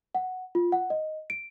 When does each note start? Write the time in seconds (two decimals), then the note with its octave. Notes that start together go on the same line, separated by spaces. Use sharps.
0.15 F#5
0.55 F4
0.72 F#5
0.90 D#5
1.30 D7